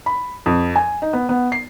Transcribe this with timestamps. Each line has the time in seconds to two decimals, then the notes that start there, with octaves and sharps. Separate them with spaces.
0.06 B5
0.46 F2
0.76 G#5
1.02 D#4
1.13 B3
1.29 B3
1.52 C7